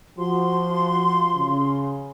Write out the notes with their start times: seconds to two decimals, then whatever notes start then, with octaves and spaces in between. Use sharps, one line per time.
0.18 F3 F#4 C6
1.36 C#3